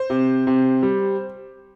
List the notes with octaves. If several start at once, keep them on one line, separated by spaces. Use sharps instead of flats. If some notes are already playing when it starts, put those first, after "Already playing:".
Already playing: C5
C3
C3
G3